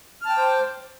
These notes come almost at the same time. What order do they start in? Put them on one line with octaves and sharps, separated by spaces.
F6 A5 G5 D6 C5